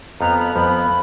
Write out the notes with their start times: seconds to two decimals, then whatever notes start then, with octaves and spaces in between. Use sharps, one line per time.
0.21 F2 F3 B3 A#5
0.39 B5
0.55 F2 F3 B3 B5